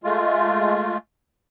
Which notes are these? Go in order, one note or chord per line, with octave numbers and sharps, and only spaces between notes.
G#3 A3 F4